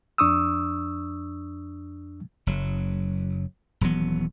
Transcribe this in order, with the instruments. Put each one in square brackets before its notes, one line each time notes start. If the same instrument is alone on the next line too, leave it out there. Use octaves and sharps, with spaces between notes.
[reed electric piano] F2 D4 C#6 D#6 E6
[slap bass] F#1 F#3
D#1 E3 F#3 B3